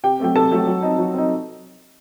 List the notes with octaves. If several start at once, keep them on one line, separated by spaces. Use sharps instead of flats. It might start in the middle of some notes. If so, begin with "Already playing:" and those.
C3 G4 G5
F#3 A3 C4 G5
C3 A4 A5
F#3 A3 C4
F#3
C4 D#4
F#3
C4 D#4